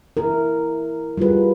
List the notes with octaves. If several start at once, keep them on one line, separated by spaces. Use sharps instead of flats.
E4 A#4
G3 F4 G#4 B4